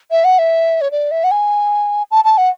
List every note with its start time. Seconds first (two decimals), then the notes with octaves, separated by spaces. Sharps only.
0.11 E5
0.24 F#5
0.39 E5
0.81 C#5
0.91 D5
1.11 E5
1.24 F#5
1.31 G#5
2.11 A5
2.25 A5
2.38 F#5